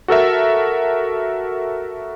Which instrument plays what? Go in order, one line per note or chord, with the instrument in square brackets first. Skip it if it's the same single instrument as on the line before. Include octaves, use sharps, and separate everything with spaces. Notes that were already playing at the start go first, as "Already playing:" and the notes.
[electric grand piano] F#4 A4 A#4 E5